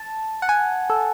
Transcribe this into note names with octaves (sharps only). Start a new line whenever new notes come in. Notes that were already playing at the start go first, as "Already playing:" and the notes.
Already playing: A5
F#5
G#5
A4